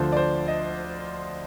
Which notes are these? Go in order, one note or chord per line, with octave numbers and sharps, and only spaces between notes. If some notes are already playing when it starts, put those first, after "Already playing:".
Already playing: D2 D3 F3 C5
D5
C5
D#5